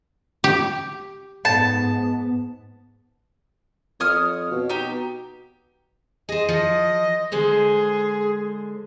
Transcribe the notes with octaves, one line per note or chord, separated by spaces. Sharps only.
G4
G#2 B3 A5
F2 C#5 D#6 F6
B2
D#4 G4
G#4 C5 D#5
F3 D#5
D3 G#3 G#4 C5